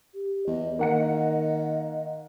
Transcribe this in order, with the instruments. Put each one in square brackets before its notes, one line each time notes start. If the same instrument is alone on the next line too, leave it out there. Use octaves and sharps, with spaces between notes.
[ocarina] G4
[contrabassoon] E2 [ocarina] D#5
[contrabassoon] D#3 [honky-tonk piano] A#3 F#5 C#7